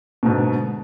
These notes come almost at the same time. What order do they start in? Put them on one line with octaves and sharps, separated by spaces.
B2 G#2 D3